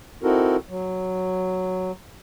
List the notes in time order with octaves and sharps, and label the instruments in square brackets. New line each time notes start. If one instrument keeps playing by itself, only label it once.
[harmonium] C4 D#4 E4 F#4 A4 A#4
F#3